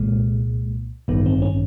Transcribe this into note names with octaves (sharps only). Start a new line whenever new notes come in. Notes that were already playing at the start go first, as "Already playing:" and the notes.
Already playing: C2 A#2 G#3
A1 G2 D#3 B3
C4
C#4